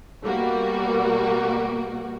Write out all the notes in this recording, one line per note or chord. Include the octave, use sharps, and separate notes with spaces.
B2 G3 A#3 F#4